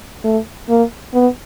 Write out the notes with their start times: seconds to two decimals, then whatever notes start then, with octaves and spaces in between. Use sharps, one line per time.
0.24 A3
0.69 A#3
1.14 B3